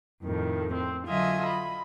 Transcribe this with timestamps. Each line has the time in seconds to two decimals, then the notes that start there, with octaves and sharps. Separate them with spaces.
0.23 F2 A2 D#3
0.73 C4
1.06 D3 F#3 F4 D#5 E5 G#5
1.46 B5